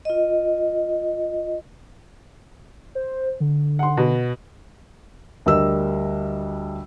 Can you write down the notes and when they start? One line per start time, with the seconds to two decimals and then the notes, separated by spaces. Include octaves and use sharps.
0.05 F4 D#5
2.95 C5
3.40 D3
3.79 F#5 C6
3.97 B2
5.46 D2 G3 A#4 D#5 E6